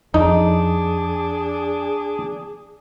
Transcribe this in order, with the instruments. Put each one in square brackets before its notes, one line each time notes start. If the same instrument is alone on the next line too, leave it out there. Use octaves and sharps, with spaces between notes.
[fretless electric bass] F2 [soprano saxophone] D4 [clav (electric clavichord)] D#4 [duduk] G#4